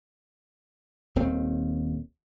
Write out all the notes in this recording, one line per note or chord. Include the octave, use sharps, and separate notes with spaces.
D#1 D#2 D#3 C4